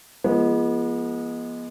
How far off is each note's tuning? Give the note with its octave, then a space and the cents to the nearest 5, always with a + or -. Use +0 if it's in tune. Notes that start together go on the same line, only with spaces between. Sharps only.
F3 -35 G#3 +0 B3 -30